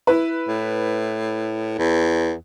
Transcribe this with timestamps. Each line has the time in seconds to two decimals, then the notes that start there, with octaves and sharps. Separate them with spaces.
0.07 E4 B4
0.48 A2
1.78 E2